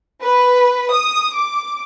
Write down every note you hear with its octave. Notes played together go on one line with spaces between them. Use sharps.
B4
D#6
D6